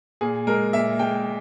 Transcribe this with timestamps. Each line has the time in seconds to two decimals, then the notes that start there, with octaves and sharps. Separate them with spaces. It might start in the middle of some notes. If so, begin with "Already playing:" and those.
0.21 A#2 G#4
0.47 G#3 A#4
0.73 A#2 E5
0.99 G#3 G5